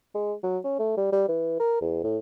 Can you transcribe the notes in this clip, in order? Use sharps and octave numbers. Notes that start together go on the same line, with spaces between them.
G#3
F#3
C#4
A3
G3
G3
E3
A#4
E2
A2